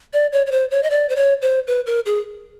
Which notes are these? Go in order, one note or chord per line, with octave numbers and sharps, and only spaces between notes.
D5
C#5
C#5
C5
C#5
D#5
D5
C5
C#5
C5
B4
A#4
G#4